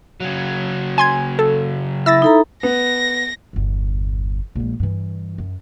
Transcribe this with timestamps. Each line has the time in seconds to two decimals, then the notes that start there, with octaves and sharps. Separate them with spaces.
0.21 C#3 F#3
0.98 G#5 C6 G#6
1.39 A4
2.06 E4 E6 A6 A#6
2.22 D#4 A4 A#5
2.63 B3 A#6
3.53 G1 E2
4.55 A#1 G#3
4.80 G2 E3
5.38 F#2